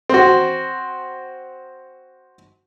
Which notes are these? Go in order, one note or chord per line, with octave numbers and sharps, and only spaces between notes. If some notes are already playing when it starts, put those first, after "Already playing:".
C4 F#4